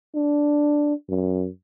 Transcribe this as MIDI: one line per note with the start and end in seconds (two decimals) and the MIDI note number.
0.15 0.94 62
1.09 1.48 42